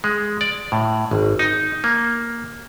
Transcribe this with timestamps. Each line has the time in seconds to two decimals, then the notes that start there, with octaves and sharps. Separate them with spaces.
0.04 G#3
0.41 D5
0.72 A2
1.11 G#1
1.39 D#4
1.84 A#3